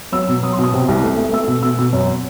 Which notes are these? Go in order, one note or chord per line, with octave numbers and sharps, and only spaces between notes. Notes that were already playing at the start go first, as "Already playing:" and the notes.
F#3 E6
B2
F#3 D#6
C6
B2 D#6
C3
C2
A3
A3
A3 E6
B2
B2 E6
B2
F#2